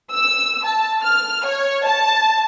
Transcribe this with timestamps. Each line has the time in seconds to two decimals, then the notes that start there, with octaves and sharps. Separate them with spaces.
0.11 E6
0.64 A5
1.03 F6
1.45 C#5
1.85 A5